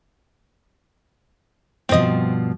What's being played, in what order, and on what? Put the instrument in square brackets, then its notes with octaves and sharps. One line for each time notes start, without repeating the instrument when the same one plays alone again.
[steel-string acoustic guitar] G2 B2 F3 [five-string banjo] C4 D#5